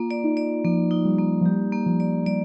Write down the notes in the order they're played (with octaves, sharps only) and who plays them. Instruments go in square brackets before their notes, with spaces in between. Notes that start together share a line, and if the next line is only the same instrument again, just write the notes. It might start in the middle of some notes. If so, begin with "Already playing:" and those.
Already playing: [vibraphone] A#3 [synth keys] F4
[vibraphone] D5
[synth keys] D#4
[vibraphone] D5
[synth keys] F3 [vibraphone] A#3
[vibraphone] D#4
[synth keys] G3
[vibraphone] A#3
[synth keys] F3
[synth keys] G3 [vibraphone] G4
[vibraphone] A#3
[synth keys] F3
[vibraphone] D5
[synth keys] G3 [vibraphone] D5